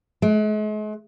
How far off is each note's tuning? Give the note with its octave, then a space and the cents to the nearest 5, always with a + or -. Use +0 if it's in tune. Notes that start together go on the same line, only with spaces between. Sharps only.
G#3 +45